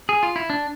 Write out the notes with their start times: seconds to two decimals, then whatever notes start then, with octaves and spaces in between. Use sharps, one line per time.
0.09 G#4
0.23 F4
0.36 E4
0.50 D4